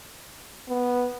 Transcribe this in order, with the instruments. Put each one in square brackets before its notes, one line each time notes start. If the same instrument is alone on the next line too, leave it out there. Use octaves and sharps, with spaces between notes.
[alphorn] B3